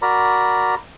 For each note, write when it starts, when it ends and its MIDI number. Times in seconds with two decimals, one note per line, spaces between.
0.02 0.75 66
0.02 0.75 70
0.02 0.75 74
0.02 0.75 82
0.02 0.75 83